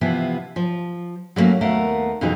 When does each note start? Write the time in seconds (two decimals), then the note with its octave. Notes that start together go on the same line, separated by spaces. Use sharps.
0.01 C3 E3 F3 B3 E4
0.56 F3
1.36 F#3 G3 A3 A#3 C#4
1.61 D#2 A3 B3 A#4 F5 F#5
2.21 F2 B2 E3 F#3 G#3 D#4